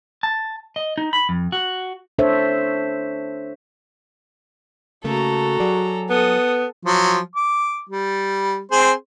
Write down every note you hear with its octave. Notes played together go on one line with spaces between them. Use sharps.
A5
D#5
D#4
B5
F2
F#4
D4 A4 C5 C#5 E5
C#3 A3 A#3 F#4 A4 A#5
F#3 G#4 D5
B3 A4 D#6
F3 F#3
D6
G3
C4 G#4 C5